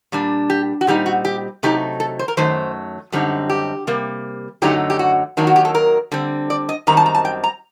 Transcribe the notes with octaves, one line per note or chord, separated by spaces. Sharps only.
A#2 G3 D4
G4
F#4
A#2 G3 C4 D#4 G4
F#4
G4
C3 F#3 A3 D#4 G4
A4
C5
A#4
F#2 D#3 F#3 A3 C5
F#2 D3 G3 C4 D#4
G4
C3 G3 A#3
F#2 D3 F#3 A3 D#4 G4
G4
F#4
D#3 F#3 A#3 D4
F#4
G4
A4
A#4
D3 G3 C4
D5
D#5
F#2 D#3 G3 C4 D#4 A#5
A5
A#5
A5
G5
A#5